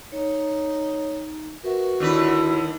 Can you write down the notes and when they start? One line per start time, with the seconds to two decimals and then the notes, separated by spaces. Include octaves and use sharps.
0.12 D#4 C#5
1.64 F#4 A#4 B4 E5
2.00 D#2 D3 E4 F4 B4 B5